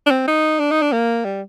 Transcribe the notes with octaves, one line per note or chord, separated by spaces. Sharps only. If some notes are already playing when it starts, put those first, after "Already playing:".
D4
C4
D#4
D4
D#4
D4
A#3
G3